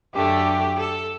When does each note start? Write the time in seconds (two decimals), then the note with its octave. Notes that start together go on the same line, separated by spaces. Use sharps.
0.15 F#2 D3 A3 G4
0.77 A4